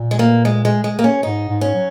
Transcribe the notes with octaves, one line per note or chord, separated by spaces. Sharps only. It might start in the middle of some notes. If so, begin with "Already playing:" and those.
Already playing: A#2
G#3
A#3
G#3
G#3
G#3
A#3
C#4
G#2 D#4
G#2
C#4
F#3